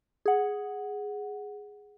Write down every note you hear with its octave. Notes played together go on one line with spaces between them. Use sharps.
G#4 F#5